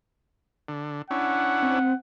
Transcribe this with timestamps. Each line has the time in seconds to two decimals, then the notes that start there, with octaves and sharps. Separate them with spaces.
0.68 D3
1.11 C#4 D4 E4 F#5
1.62 C4